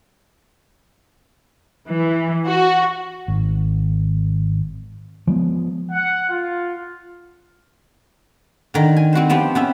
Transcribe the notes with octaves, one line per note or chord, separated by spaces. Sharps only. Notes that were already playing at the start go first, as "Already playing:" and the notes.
E3
F#4
G#1
F3 G#3 B3
F#5
F4
D3 D#3
G#5
C4 F#4 B4 C5
F3 B3 C4 G4
B3 C#4 E5